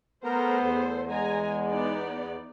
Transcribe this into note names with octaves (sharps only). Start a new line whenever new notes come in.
A3 B3 A4 A#4 C5 A#5
E2
G#3 G#5 A#5
B3 D#4 D5